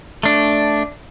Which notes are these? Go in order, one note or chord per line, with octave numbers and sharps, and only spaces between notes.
A3 D4